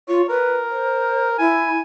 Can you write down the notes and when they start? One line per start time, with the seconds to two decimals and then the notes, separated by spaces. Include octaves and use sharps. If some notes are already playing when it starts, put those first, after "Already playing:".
0.08 F4 C#5
0.29 A#4 B4
0.69 C5
1.38 E4 G#5